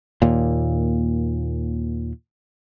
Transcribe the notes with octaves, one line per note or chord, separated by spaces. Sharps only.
D#2 A#2